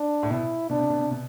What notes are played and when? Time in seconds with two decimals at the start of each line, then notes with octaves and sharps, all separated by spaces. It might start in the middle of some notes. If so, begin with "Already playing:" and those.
Already playing: D4
0.23 A2
0.30 B2 E4
0.69 B2 D4
0.79 C3
0.90 B2
1.00 C3
1.11 B2